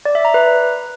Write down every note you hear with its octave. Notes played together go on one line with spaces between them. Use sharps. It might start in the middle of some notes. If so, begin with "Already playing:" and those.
D5
E5
A#5
B4